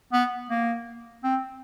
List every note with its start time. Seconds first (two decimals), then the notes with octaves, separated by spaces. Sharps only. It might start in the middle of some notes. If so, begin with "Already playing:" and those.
0.13 B3
0.50 A#3
1.24 C4